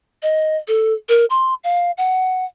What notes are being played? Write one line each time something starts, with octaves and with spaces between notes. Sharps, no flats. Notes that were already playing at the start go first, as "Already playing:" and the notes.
D#5
A4
A#4
C6
F5
F#5